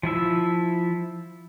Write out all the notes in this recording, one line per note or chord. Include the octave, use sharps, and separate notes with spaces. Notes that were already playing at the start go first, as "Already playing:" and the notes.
F3 E4 E5